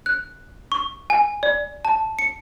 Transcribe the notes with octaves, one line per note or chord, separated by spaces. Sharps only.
F#6
C#6
G#5
D5
A5
C#7